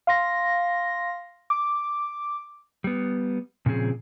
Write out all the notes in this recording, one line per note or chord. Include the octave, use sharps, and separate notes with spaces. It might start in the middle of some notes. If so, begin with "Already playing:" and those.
F5 C6 A#6
D6
G3 B3
A#2 C#3 F3 C4 G#4